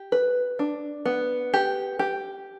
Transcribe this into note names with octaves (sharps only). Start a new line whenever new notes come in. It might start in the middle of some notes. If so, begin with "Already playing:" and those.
Already playing: G4
B4
D4
B3
G4
G4